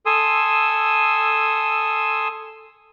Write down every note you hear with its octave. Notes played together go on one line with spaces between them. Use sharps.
A4 G#5 C6 D#6 E6